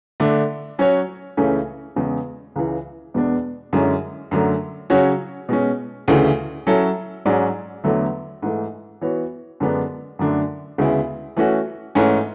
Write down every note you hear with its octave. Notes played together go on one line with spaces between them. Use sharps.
D3 A3 D4
F#3 C#4 F#4 C#5
C#2 C#3 E3 A3 C#4
E2 C#3 G#3
C#2 C#3 E3
E2 B2 G#3 B3 D4
F#2 D3 G#3 C#4 E4
F#2 D3 F#3 A3
C#3 F#3 C#4 F#4 C#5
B2 G#3 C#4
D2 C#3 E3 A3
F#3 C#4 E4 A4
G#2 F#3 C#4 G#4 D5
E2 D3 F#3 A3 E4
G#2 E3 A3
E3 B3 F#4 C#5
F#2 D3 G#3 B3 D4
F#2 D3 A3 D4
D2 C#3 G#3 B3 E4
E3 A3 C#4 F#4
G#2 E3 A3 C#4